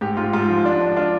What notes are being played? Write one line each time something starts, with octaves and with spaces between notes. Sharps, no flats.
G#2 G4
G#2 F4
G#2 F4
F3
D4
D4
D4 F4